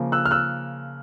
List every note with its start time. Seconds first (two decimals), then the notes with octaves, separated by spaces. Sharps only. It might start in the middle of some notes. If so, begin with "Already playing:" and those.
Already playing: C#3 F3 A#3
0.12 E6 F#6
0.25 F6
0.31 E6 F#6